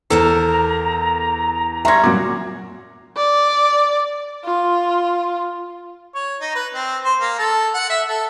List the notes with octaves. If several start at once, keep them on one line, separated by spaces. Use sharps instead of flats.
E2 A4 A#4 C5 A#5
G3 C#4 E5 A#5 C6 C#6 G#6 A#6
F#2 A#2 F#4 D6
D5
F4
C#5
D#4
B4
C4
C5
A#3
A4
F#5
E5
A4